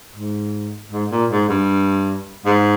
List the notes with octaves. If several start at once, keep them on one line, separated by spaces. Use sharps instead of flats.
G#2
G#2
A#2
G#2
G2
G#2